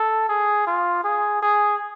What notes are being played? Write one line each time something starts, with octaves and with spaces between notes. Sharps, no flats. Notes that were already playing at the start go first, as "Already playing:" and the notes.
Already playing: A4
G#4
F4
G#4
G#4